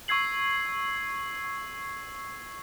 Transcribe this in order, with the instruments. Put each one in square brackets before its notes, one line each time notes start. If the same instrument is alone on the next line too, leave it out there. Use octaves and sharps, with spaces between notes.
[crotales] C#6 E6 G#6 C7 F#7